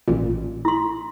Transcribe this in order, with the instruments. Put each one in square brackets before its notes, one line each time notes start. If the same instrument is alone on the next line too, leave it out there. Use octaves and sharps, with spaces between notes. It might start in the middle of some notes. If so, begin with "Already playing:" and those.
[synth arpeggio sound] A1 A#2
[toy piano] E4 C6